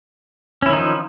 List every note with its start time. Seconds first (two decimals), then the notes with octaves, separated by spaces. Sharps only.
0.62 C#4
0.66 E4
0.69 D#3
0.73 D#4
0.76 F3